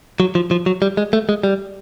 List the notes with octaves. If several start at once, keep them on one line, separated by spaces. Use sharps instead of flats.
F#3
F3
F3
F#3
G3
G#3
A3
G#3
G3